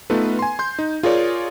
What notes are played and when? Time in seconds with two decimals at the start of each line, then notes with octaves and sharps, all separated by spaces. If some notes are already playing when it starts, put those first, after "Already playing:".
0.10 A3 B3 D#4 F4 A4 B4
0.39 G#5 C6
0.59 C6 G6
0.79 D#4
1.03 F4 G#4 A#4 C#5 D5